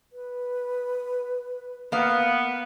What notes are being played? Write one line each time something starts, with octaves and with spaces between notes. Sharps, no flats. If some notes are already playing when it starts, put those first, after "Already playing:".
B4
A#3 B3 F5